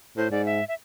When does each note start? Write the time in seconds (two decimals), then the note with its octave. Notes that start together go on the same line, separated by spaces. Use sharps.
0.17 A2 C5
0.31 G#2 D5
0.46 E5
0.68 E5